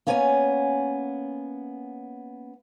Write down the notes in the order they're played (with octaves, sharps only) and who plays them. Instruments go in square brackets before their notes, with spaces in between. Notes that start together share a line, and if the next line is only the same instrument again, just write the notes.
[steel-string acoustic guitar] A#3 B3 C#4 C#5 G5 G#5